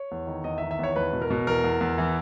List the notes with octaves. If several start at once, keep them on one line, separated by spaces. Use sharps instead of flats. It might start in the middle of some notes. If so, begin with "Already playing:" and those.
Already playing: C#5
E2
D#3
E2 D#5
E5
D#3
E5
E2 C#5
E2 B4
B2
A#4
B2
E2 A#4
E2
E2
E3